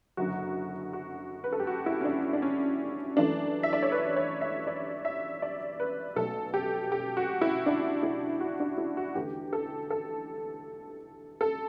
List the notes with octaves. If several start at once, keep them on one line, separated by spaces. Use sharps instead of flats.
F#1 F#2 D3 F#4
F#4
B4
A4
G4
F#4
E4
C#4
D4
D4
C#4
F#2 E3 A3 D4
E5
D5
C#5
B4
C#5
E5
D5
E5
D5
B4
B1 B2 A3 A4
G4
G4
F#4
E4
D4
E4
F#4
D4
E4
F#4
E2 D3 A3 G4
A4
A4
A4